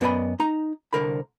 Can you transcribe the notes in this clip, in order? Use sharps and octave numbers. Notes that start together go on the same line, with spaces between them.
F#2 B3 D5 D#5 G#5 B5
D#4 A#5
C2 F#2 D3 A#4 C5 B5